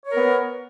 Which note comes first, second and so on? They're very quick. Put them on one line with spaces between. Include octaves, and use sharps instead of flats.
C#5 A#4 B3